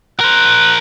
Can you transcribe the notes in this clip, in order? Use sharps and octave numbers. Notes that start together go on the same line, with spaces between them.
A#4 C5 F#6